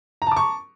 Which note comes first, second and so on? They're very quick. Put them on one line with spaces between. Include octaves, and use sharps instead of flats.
A#5 A5 D6 C#6